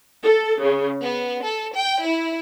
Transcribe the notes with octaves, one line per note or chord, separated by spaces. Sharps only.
A4
C#3
B3
A4
G5
E4